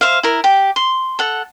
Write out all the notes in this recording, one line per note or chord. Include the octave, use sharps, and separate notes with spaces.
C5 E5 F5
E4 A#4
G4
C6
A4 F#5